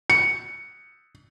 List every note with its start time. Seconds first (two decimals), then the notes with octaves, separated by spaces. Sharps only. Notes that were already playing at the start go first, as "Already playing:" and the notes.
0.10 C#7